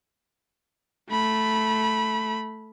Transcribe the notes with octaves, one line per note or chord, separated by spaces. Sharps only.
A3 B5